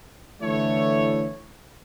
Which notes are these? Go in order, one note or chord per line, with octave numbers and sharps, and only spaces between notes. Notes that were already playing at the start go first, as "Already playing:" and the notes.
D3 E3 A3 E4 C#5